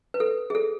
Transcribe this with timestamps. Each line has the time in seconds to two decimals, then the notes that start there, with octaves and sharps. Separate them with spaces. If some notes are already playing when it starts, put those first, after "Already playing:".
0.14 B4
0.20 A4
0.50 G#4
0.55 A4